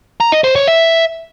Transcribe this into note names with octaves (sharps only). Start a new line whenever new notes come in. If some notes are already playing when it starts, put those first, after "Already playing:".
A#5
D#5
C5
C#5
E5